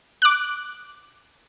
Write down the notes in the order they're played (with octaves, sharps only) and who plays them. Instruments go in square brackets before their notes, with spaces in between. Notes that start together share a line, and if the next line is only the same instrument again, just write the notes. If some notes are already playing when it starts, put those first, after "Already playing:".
[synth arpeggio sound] D6 F#6